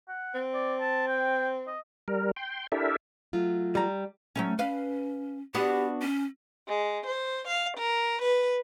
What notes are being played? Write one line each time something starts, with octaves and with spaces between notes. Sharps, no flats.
F#5
C4
D5
A5
G5
D#5
G3 A#4
G5 C6
D4 E4 G4 A4 A#4 E5
F#3 A3 F4
G3 A#5
F#3 A3 C#4
C#4 B4 F5
B3 D4 F#4 G4
C#4
G#3
C5
F5
A#4
B4